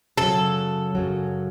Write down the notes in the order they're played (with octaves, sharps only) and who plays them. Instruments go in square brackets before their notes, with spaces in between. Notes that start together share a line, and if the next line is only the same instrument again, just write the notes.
[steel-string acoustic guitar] F#2 C#3 F#3 [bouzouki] A4
[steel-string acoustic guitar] F#2 C#3 F#3